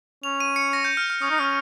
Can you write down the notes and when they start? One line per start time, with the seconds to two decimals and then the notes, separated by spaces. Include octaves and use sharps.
0.23 C#4 F7
0.40 D#7
0.56 C#7
0.73 A#6
0.85 G6
0.97 F6
1.10 F6
1.22 C#4 D#6
1.31 D#4
1.38 C#4 F6